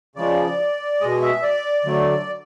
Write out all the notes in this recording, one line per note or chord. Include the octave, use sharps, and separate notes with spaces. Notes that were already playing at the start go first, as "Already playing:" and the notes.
C#3 F3 G#3 D5
B2 G#3 D#5
E5
D5
D3 F#3 A3